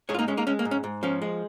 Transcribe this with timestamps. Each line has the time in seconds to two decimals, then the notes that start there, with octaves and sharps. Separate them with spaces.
0.09 G#2 G#4 C#5
0.14 F4
0.19 A#3 D#4
0.28 G#3 C#4
0.37 A#3 D#4
0.47 G#3 C#4
0.59 A#3
0.65 G#2
0.71 C#4
0.84 G#2
1.03 F3 C#4
1.22 G#3